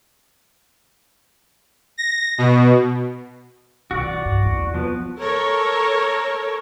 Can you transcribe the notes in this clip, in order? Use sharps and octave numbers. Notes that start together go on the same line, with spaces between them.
A#6
B2
B2 E3 F#4 D5
G2
E2 A#3
F3 B3
A4 A#4 C#5